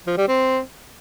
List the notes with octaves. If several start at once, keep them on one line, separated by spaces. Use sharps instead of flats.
F3
G3
C4